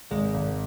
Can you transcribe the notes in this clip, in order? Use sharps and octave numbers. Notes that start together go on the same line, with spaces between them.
G#1 G#3
G#1